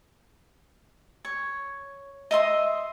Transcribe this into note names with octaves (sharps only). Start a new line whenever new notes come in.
C#5
D#5 E5 C6 D#6